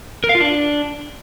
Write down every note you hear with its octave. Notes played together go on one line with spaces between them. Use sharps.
A#4
F5
F4
D4